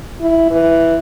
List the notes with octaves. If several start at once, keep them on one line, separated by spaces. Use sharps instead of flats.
E4
E3